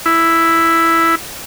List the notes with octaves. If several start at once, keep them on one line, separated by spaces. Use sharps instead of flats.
E4